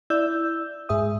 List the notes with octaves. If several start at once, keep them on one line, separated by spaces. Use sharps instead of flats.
E4 D5 E6 G6
G#2 G#4 E5 D#6